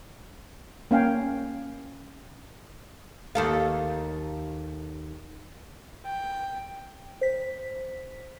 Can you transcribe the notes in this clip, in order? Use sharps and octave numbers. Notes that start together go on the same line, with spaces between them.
A#3 C#4 F5 G5 G#5
D#2 A4 F5
G5
C5 B6